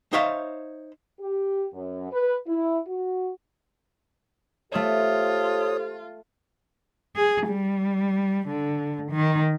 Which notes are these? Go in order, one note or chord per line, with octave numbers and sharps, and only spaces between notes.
D#4 C5 C#5 E5 F5
G4
F#2
B4
E4
F#4
A3 F4 G4 A4 C5 C#5 D#6 E7
G#4
G3
D3
D#3